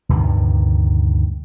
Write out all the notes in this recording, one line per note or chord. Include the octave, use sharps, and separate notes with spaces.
D2 G2 C3 D#3